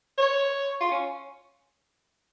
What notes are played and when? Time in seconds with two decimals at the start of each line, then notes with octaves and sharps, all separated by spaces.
0.18 C#5
0.80 F4
0.91 C#4